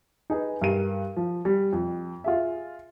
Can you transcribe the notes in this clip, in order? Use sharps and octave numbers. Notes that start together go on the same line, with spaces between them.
D#4 G#4 B4
G2 A#4 D#7
F3
G3
F2
F4 G#4 E5